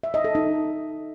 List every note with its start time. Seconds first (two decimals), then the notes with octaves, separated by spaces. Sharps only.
0.03 E5
0.14 D#5
0.24 A4
0.35 D#4